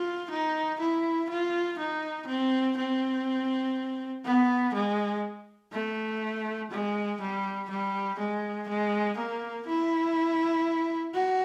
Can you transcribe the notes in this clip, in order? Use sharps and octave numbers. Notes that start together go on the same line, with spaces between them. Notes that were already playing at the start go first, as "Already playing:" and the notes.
Already playing: F4
D#4
E4
F4
D#4
C4
C4
B3
G#3
A3
G#3
G3
G3
G#3
G#3
A#3
E4
F#4